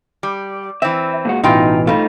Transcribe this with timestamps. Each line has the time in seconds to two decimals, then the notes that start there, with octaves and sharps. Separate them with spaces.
0.23 G3
0.82 E3 C4 E5
1.25 A#2 G#3 F#4
1.44 A1 G2 B2 E3 D#4 F4 G5
1.87 G3 A3 D#4 F4